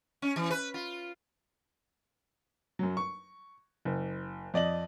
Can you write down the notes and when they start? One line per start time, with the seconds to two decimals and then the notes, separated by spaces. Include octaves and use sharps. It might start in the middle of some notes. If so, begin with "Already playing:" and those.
0.22 C#4
0.36 E3
0.50 B4
0.74 F4
2.79 F#2 F#3
2.97 C#6
3.85 F#1
4.54 F2 D5 D#5 F#7